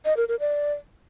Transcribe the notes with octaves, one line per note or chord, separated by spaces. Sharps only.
D#5
A#4
A#4
D5